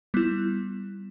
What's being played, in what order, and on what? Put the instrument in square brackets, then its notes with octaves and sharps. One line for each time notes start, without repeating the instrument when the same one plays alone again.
[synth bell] G3 B3 E4